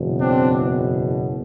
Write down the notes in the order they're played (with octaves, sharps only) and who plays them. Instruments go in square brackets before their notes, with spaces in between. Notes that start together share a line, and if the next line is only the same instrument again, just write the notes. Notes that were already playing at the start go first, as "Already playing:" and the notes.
Already playing: [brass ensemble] F#1 E2 B2
C4 D4